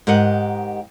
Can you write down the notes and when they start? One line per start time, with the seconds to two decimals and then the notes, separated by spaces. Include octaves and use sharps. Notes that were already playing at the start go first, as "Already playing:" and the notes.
0.07 G#2 G4 A#4 D#5 F#5